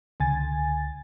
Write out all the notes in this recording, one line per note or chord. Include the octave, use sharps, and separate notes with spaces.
C#2 D3 G#5 A6